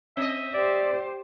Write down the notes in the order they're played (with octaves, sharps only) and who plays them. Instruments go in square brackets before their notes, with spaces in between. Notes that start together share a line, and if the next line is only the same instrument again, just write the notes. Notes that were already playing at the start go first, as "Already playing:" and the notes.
[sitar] C4 D#5 [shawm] E5
[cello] G4 C5 [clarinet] D5